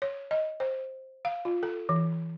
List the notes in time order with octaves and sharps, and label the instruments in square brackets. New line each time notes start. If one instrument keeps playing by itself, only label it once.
[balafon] C#5
D#5
C5
F5
F4
A4
E3